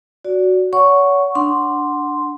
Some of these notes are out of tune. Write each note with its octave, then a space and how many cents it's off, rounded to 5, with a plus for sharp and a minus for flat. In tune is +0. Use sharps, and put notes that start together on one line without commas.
F#4 +0 D5 -20
C#5 +35 F#5 +0 C#6 +0
D4 +0 F#5 +0 C6 +0